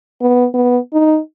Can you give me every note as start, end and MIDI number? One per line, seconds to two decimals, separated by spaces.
0.22 0.47 59
0.54 0.78 59
0.93 1.19 63